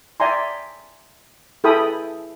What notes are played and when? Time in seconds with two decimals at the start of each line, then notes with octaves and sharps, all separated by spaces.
0.20 D5 E5 G5 G#5 A#5 C6
1.64 E4 G#4 A4 G5 B5 D#6